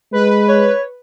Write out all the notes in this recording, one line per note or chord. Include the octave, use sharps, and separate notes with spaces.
G#3 B4
C#5